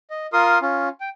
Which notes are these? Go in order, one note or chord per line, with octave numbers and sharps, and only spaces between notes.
D#5
F4 A#4 C6 D#6
C#4 F4
G5